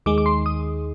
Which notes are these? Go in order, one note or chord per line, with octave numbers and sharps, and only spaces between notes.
D#2 D#3 G#3 D6
D6
C6
D#6